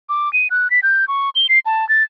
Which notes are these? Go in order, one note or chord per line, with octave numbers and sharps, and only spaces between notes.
D6
D#7
F#6
B6
G6
C#6
G7
C7
A5
A6